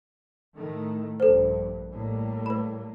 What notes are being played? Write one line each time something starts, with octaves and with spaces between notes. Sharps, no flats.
A2 D#3 A3
A#1 G2 A4 C5
A2 G3 A#3
B4 B5